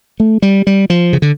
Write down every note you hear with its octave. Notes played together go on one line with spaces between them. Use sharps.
A3
G3
G3
F3
C#3
D3